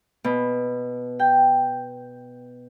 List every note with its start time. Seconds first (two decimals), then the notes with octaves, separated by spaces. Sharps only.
0.24 B2
1.20 G5